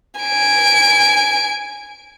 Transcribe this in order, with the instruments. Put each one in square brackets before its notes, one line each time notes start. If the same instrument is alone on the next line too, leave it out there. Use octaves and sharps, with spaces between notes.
[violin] G#5 D7